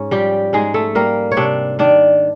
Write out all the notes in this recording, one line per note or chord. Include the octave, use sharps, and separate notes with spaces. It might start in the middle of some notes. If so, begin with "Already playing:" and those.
Already playing: G#2 C#4 C#5
F3 G3 G4
G#2 G#3 G#4
A3 A4
G3 A#3 A#4
C#5
C3 D4 D5
D#3 D4 D5